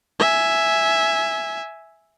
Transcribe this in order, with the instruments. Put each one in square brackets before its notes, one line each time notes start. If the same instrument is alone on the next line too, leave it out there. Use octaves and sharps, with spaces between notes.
[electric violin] E5 G#5